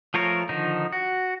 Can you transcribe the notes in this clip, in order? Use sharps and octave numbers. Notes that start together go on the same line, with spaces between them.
F3 A3 F4 A#4 C#5
D3 D#3 F3 D#4
F#4